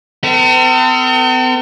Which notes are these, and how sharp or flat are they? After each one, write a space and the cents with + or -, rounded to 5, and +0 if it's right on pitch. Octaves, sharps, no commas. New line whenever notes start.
C4 -45 A4 +45